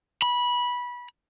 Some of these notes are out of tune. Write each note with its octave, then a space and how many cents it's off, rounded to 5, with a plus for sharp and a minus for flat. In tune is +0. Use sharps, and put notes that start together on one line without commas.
B5 -20